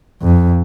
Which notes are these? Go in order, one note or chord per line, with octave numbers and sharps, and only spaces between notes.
F2